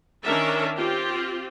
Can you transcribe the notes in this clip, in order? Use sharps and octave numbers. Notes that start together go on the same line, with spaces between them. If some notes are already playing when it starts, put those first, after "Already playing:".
D#3 C#4 D4 A#4 E5 A5
C4 F4 G4